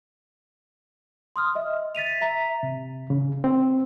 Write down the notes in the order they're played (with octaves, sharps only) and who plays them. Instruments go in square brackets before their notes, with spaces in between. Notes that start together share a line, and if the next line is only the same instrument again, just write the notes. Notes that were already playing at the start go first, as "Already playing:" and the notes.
[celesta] C6 D#6 F6
D#5 E5
A6 B6 D#7 F7
E5 A#5 B6
[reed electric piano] C3
C#3
C4